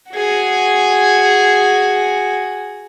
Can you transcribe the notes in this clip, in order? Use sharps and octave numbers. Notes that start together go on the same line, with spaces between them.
F#4 G#4